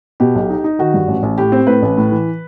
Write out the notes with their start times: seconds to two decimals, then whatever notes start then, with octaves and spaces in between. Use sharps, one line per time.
0.20 B2 G4
0.35 B1
0.50 D#4
0.64 D#4
0.79 D#3 F#4
0.94 G2
1.08 A1
1.23 A1
1.38 A2 G4
1.52 C4
1.67 A2 B4
1.82 A1
1.97 A2
2.12 E3